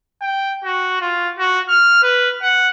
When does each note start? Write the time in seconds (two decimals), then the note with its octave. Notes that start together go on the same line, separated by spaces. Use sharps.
0.22 G5
0.64 F#4
1.01 F4
1.39 F#4
1.69 F6
2.03 B4
2.42 F#5